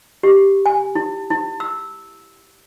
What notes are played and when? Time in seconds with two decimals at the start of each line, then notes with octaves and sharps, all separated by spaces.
0.23 G4
0.66 G#5
0.95 E4
1.30 E4
1.60 E6